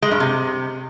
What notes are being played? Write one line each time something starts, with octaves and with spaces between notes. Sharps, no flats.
G#3
G2
C3